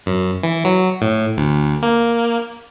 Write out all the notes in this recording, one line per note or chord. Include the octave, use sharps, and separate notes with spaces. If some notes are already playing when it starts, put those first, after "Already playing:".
F#2
E3
F#3
A2
D2
A#3